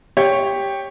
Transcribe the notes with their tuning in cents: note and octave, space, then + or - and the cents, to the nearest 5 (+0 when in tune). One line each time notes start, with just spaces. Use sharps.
G4 +5 C#5 -5